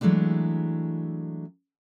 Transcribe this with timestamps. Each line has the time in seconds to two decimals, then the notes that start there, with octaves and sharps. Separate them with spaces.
0.01 E3 F#3 G#3 A3 D4